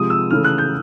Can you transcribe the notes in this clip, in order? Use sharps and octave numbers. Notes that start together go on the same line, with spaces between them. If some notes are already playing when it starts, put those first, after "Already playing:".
Already playing: C3 F3 G#3 D#6
E6
C#3 E3 A3 F6
F#6
G6